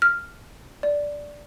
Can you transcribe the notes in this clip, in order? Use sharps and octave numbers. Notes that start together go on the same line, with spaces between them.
F6
D5